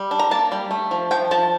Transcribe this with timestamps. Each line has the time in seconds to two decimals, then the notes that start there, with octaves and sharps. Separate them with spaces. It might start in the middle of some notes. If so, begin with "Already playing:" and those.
Already playing: G3
0.11 D4
0.19 A#5
0.31 A#3 A5
0.52 G3
0.71 A3
0.91 F3
1.11 F3 G5
1.31 F3 A5